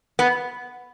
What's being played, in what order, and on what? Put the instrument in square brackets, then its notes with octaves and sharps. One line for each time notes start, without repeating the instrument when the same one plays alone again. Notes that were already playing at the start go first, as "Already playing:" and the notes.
[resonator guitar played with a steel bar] B3